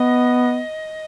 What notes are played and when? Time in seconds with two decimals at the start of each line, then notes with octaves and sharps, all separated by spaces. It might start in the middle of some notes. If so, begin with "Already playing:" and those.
Already playing: B3 D#5